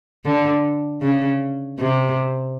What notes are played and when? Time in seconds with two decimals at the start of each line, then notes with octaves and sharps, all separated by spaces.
0.25 D3
1.02 C#3
1.78 C3